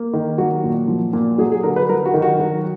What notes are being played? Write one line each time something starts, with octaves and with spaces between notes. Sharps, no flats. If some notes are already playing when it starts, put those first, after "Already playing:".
Already playing: A#3
D#3
F#3 F#4
A#2
F3
A#2
F#3 G#4
G#4
D3 A#4
B4
F#3 A#4
F#4
D#3
F#4
F#3